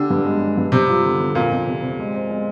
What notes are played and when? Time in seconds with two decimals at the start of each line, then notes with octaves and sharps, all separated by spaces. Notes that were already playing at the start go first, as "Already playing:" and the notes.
Already playing: D3 G4
0.10 G2
0.25 G#3
0.41 G#3
0.57 G2
0.72 C3 G3
0.89 F4
1.05 D3
1.19 D3
1.35 F2 A#2
1.52 F2
1.67 C3
1.82 C3
1.99 G#3
2.14 C4
2.30 G#3